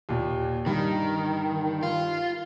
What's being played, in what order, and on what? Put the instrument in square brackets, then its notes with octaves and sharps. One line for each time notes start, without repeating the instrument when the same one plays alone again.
[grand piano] D#2 A#2
[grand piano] G2 [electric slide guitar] D#3
[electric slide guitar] F4